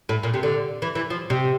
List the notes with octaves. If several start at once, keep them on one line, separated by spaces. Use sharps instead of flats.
A2
A#2
C3
D3
E3
E3
F3
C3